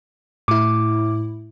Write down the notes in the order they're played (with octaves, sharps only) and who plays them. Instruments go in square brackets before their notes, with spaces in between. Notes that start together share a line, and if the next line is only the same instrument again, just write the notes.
[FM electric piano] A2 E4 [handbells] D6